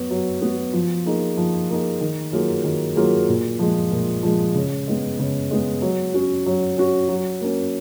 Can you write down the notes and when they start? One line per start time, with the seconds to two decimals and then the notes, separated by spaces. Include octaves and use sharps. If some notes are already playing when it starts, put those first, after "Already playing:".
Already playing: F#3 B3 F#4
0.11 F#3
0.42 B3 F#4
0.73 F3
1.06 A#3 D#4 G#4
1.37 F3
1.70 A#3 D#4 G#4
2.01 D#3
2.32 F#3 A#3 F4 G#4
2.64 D#3
2.96 F#3 A#3 F4 G#4
3.29 A#2
3.59 F3 G#3
3.92 A#2
4.23 F3 G#3
4.55 C#3
4.87 G#3 B3
5.19 C#3
5.51 G#3 B3
5.82 F#3
6.14 C#4 F#4
6.46 F#3
6.77 C#4 F#4
7.09 F#3
7.41 A#3 C#4